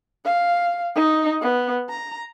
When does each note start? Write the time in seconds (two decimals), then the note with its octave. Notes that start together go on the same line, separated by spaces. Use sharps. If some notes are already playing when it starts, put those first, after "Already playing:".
0.25 F5
0.96 D#4
1.41 B3
1.89 A#5